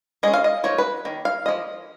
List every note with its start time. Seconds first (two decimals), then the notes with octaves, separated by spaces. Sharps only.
0.23 G#3 C#4 D#5
0.34 F5
0.44 D#5
0.64 F3 A#3 D#4 C#5
0.78 B4
1.05 D#3 A#3
1.25 F5
1.46 F3 A#3 D#5